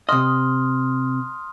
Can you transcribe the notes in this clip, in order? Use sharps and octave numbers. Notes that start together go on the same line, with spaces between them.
C3 D#5 C6 D#6 F6